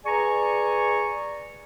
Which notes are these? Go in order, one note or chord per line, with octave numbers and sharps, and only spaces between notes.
G#4 B4 D5 G#5 A#5 C#6